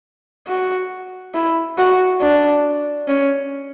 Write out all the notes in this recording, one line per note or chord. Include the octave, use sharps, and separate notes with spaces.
F#4
E4
F#4
D4
C#4